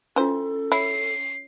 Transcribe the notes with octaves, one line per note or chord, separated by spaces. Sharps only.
E3 C#4 F4 A4 C5
E4 C#5 C7